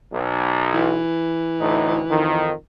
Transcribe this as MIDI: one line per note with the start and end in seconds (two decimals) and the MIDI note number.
0.13 1.01 35
0.74 2.53 52
1.60 2.02 38
1.60 2.02 45
1.60 2.02 63
2.10 2.53 41
2.10 2.53 51